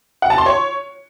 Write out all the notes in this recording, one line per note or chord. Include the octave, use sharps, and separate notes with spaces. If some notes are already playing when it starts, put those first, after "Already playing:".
F#5
A5
C6
C#5